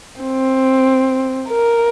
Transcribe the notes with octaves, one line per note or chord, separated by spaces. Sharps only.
C4
A#4